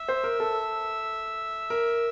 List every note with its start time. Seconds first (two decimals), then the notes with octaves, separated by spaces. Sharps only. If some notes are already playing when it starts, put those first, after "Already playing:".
Already playing: E5
0.08 C5
0.24 A#4
0.40 A4
1.70 A#4